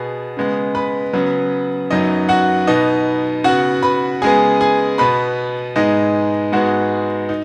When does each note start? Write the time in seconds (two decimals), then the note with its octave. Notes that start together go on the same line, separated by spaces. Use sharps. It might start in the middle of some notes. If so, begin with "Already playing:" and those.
Already playing: B2 B3 G#4
0.37 C#3 G#3 B3
0.75 B4 B5
1.13 C#3 F#3 B3 B4
1.91 F#2 F#3 B3 D#4 D#5
2.29 F#4 F#5
2.67 B2 B3 D#4 D#5
3.44 C#3 B3 F#4 F#5
3.83 B4 B5
4.22 C#3 G#3 B3 G#4 G#5
4.61 G#4 G#5
4.98 B2 B3 B4 B5
5.76 G#2 G#3 B3 D#4 D#5
6.52 G#2 G#3 B3 F#4 F#5
7.29 D#4